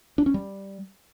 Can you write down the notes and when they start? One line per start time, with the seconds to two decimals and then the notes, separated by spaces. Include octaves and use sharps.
0.18 D4
0.26 C#4
0.34 G3